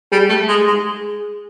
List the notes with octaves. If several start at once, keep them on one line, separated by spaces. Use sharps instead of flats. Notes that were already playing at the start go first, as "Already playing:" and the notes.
G3 G#4
A3
G#3
G#3